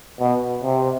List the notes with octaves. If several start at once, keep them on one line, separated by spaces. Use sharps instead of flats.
B2
C3